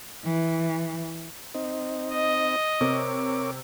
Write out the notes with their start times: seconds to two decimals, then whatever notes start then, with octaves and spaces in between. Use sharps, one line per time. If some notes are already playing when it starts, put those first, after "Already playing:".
0.25 E3
1.54 C4 D#4
2.11 D#5
2.81 C3 A#4 C#5 D6